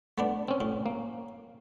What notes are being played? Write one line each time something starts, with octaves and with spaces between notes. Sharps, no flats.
A3 B3 D4
C4 C#4
A2
A#3